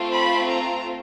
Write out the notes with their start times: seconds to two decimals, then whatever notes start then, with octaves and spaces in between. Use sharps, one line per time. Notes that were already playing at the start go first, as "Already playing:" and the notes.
Already playing: A3 C4 F4
0.14 B5
0.50 A#5